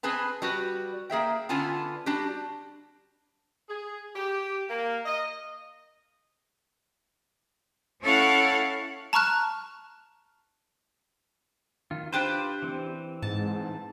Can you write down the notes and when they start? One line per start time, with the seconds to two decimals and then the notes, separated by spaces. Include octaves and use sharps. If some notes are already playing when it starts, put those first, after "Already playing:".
0.03 C4 G#4 B4 G#5 A5
0.42 G3 F#4 B4
1.10 A#3 G#4 E5 G5
1.49 D3 B3 C#4 F4 G#5 A5
2.06 G3 D4 F#4 G4
3.69 G#4
4.16 G4
4.70 A#3
5.06 D#5
8.01 C#4 E4 A4 C#5 F5 F#5
9.13 A5 A#5 C#6 F6 F#6
11.91 D#3 F4
12.12 D4 F4 G4 B4 C5
12.62 E3 C4
13.22 G#2 A5